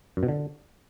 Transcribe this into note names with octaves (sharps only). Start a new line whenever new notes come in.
F#2
B2
D3